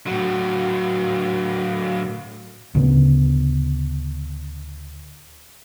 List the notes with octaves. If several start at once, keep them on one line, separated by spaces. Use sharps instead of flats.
A2 F#3
D2 A2 C#3 B3